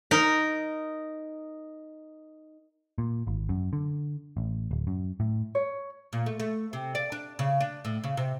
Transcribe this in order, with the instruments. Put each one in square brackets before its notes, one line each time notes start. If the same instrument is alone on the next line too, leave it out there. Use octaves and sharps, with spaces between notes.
[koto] D#4 A#4
[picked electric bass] A#2
G#1
F#2
D3
A1
D1
F#2
A2
[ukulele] C#5
[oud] A#2
A3
A3
C3
D5
D4
C#3
D4
A2
C#3
C3